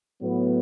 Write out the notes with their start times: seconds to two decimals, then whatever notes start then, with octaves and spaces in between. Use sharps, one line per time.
0.21 A2 F#3 B3